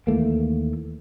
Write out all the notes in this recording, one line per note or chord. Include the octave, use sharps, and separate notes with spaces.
D#2 E3 A3 A#3